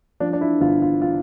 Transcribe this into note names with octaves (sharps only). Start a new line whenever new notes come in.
F3 D4
D4
E4
G1 F4
F4
F4